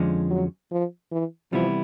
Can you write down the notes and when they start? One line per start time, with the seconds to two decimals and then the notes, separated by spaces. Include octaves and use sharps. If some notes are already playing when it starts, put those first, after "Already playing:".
Already playing: F2 D3 F3 G#3 C#4
0.31 F#3
0.71 F3
1.12 E3
1.52 C3 E3 F3 G3 B3 E4